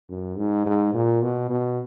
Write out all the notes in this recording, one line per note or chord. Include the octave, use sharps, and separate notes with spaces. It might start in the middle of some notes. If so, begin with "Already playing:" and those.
F#2
G#2
G#2
A#2
B2
B2